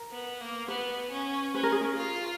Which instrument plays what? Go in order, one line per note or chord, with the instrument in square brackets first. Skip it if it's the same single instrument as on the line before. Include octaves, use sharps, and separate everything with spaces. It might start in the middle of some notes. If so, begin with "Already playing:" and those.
Already playing: [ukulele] A#4
[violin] B3
A#3
[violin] B3 [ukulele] B4
[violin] C#4
[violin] C#4 [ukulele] B4
[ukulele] A#4
G#4
A#4
[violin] F4